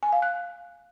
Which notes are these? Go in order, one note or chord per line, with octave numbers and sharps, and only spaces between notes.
G#5
F5
F#6